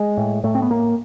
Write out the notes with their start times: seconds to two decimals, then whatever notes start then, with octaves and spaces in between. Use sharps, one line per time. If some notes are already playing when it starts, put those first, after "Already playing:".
Already playing: G#3
0.17 A2
0.43 A2 A3
0.55 C4
0.62 B3
0.70 A2 A#3